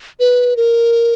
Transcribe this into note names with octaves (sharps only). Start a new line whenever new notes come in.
B4
A#4